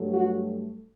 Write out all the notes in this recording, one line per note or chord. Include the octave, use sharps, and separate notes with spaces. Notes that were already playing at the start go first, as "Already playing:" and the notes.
Already playing: G2 F#3 A3
F#4